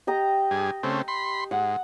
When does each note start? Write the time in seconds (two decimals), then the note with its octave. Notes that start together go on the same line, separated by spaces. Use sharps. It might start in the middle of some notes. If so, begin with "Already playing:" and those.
0.07 G4 D#5 A#5
0.51 G2 G#4
0.83 C#3 A3 C4
1.08 B5 C6
1.51 G#2 F#5